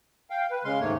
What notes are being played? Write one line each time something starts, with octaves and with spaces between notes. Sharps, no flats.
F5 G5
B4
C#3 G#3 F5 C6
D#2 G#2 A3 A#3 C#5